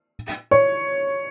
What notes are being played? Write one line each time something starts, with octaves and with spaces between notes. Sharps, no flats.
C#5